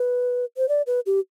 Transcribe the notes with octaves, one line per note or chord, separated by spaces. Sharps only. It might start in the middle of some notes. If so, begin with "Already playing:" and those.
Already playing: B4
C5
D5
B4
G4